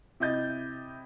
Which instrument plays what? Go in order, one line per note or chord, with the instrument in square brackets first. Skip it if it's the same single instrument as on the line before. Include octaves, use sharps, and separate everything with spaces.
[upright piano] C3 E4 D#5 G6 A6